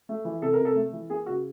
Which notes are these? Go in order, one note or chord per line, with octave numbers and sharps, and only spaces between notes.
A3
E3
C3 A4
A#4
C3
A4
A3
E3
A#3 G#4
C#3 F#4